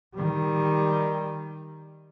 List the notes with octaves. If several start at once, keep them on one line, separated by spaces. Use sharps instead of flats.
D#3 G3